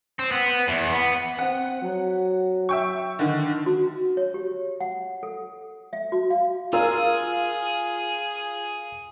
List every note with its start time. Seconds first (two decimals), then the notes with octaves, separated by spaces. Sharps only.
0.19 C4
0.31 B3
0.68 E2
0.93 B3
1.38 C4 F#5
1.82 F#3
2.69 E5 G5 C#6
3.19 D3 D#3
3.66 F#4
4.17 C#5
4.34 G4
4.80 F#5
5.23 A4
5.93 E5
6.12 F#4
6.30 F5
6.73 F4 G#4 A#4 E6